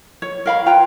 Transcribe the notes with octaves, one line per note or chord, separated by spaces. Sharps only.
C#5
A#4 F5 B5
F4 B4 G5 A#5